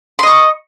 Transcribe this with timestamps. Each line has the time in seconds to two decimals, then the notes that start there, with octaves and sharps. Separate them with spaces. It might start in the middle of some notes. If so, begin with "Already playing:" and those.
0.19 C6
0.23 D#5
0.27 C#6